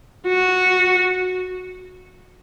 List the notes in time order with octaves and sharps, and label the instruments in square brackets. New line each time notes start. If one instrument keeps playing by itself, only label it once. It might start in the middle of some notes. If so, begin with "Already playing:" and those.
[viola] F#4